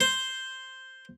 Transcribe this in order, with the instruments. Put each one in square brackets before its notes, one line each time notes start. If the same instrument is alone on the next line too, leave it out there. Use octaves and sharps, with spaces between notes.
[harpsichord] C5